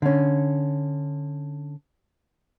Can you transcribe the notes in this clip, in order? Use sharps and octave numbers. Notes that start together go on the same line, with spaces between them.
D3 C#4